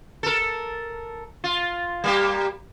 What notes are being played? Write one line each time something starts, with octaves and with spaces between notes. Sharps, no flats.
A4 A#4
F4
G3 A#3 G4